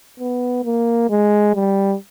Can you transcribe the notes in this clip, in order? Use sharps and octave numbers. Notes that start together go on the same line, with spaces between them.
B3
A#3
G#3
G3